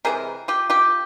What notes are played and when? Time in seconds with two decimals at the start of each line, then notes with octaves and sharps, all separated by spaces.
0.05 C3 E3 G#3 G#4 A#4
0.48 F4 G4
0.70 F4 G4